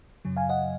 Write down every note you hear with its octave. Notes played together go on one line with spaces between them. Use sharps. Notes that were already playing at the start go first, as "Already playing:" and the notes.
F#2 C#3 F#3
F5 G#5
D#5 F#5